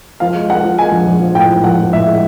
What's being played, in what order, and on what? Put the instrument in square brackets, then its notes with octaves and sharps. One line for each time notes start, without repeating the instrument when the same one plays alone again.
[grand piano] F3 F5
G#3
G#3 F#5
F3
G#3 G#5
A#1
A#1
F3
A2 G5
F3
A#1 F#5
F3
A2 E5
G#3